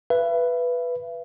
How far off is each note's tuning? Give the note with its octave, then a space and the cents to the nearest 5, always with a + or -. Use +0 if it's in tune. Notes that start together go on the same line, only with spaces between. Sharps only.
B4 +0 E5 +40